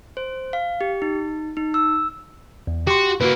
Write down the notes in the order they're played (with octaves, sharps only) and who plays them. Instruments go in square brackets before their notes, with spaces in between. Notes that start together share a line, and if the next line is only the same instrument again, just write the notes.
[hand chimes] C5
F5
G4
D#4
D#4
E6
[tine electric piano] E2
[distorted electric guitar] F#4 [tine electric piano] G4 C6
[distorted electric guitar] A#3 E4 [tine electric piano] F#4 B4